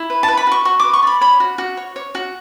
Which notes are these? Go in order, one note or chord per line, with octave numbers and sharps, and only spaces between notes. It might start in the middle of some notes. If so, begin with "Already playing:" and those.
Already playing: E4
B4
A5
B4
B5
F#4 C#6
F#4 C#6
B4 D6
C#6
D5 B5
C#5 B5
F#4
F#4
C#5
C#5
F#4